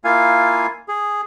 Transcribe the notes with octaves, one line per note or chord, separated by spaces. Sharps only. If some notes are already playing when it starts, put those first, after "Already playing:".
A#3 E4 F4 F5 G#5
G#4